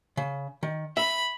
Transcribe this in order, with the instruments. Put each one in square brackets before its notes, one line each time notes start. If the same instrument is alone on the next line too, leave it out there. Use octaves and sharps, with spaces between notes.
[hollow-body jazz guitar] C#3
D#3
[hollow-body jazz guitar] E5 [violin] B5